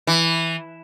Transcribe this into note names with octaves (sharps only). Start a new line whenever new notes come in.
E3